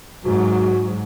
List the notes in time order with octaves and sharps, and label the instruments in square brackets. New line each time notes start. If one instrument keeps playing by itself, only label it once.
[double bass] G#2 F#3 [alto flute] F#4